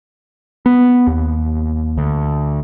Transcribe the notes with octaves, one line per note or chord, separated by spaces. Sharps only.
B3
D#2
D2